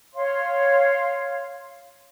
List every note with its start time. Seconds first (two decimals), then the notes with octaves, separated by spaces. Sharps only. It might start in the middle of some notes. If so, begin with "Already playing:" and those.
0.13 C#5 F5 C6